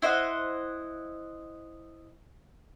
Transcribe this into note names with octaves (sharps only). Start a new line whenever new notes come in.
E4 C5 D#5 F#5